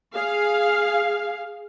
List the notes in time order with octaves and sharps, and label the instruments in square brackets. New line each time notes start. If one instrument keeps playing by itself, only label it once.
[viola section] G#4 F5